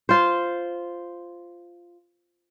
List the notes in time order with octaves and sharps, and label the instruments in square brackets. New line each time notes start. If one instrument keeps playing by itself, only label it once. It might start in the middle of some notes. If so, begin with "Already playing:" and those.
[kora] F4 C5